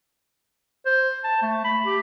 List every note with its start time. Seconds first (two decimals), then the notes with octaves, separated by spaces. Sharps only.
0.86 C5
1.24 A5
1.42 A3
1.64 B5
1.85 G4